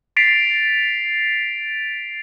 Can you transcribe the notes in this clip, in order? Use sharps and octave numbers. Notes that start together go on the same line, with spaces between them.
A6 B6 C7 D7 F7